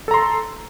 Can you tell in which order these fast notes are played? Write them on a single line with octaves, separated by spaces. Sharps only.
A4 A#5 C6